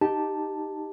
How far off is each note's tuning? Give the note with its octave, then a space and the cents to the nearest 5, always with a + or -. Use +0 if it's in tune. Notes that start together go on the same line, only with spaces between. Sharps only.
D#4 +0 G4 +0 A5 +0